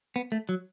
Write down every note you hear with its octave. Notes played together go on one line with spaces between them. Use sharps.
B3
A3
F#3